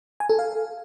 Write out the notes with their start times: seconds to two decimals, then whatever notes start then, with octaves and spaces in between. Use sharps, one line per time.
0.20 G#5
0.29 A4
0.39 F5